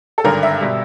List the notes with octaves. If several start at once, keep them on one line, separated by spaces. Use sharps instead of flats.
A4
G#1 G2 D3 A#4
E5
B2 G3